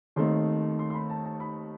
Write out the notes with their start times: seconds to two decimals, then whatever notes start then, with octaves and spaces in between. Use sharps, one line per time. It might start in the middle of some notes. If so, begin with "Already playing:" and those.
0.16 D#2 D#3 A3 C4 D#4 C6
0.79 C6
0.90 C6
0.94 B5
1.10 A5
1.25 A5
1.40 B5